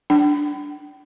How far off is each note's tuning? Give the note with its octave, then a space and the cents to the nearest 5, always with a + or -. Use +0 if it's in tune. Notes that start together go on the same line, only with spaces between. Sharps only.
D4 +0 G5 -40